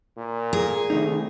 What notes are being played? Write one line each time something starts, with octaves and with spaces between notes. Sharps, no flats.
A#2
G#4 A#4
C2 D#3 A3 D#4